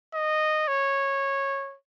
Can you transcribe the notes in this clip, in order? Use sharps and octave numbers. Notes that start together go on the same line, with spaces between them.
D#5
C#5